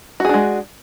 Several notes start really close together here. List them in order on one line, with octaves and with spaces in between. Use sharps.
F#4 G#4 D4 G#3